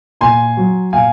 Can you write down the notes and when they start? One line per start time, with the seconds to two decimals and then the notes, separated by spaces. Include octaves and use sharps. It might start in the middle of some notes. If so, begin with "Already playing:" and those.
0.21 A#2 G#5 C6
0.57 F#3
0.93 A#2 F5 G#5